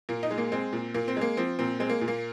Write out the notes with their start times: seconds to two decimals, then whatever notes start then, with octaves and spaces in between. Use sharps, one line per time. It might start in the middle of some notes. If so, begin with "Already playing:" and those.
0.09 A#2 A#3
0.23 D#4
0.31 G#3
0.38 A#3
0.52 G#3 C4
0.73 A#2
0.94 A#2 A#3
1.08 C4
1.17 G#3 A#3
1.37 F3 C4
1.59 A#2 C4
1.80 G#3 C4
1.89 A#3
2.01 A#2
2.08 A#3